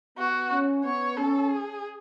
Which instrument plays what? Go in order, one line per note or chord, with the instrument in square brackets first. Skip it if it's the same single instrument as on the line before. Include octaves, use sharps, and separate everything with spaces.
[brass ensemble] B3 [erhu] F#4
[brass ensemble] C#4
[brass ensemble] B3 [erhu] C#5
[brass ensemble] C#4 [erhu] A4
[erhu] G#4